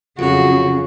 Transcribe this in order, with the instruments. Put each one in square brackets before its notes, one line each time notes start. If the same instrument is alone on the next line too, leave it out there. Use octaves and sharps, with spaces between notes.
[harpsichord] F2 F#3 [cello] C#3 [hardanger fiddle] F#4